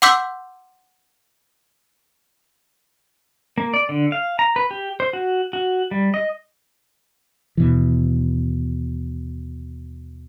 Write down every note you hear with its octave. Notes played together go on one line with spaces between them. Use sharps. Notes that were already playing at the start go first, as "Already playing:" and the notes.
F#5 C6 D6 E6 G6 B6
A#3
D5
D3
F5
A#5
B4
G4
C5
F#4
F#4
G3
D#5
D#2 B2 E3